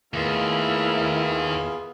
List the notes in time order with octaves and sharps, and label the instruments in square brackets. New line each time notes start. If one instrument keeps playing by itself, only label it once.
[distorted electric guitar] D#2 [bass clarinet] A3 [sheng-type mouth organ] B3 F4 G#4 [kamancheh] E4 A#4